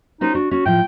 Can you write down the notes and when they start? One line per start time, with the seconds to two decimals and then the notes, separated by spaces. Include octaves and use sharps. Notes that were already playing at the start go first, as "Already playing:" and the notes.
0.21 C#4 D#4 F#4 C5
0.35 D4 F#4
0.51 C#4 F#4
0.66 A2 F3 G5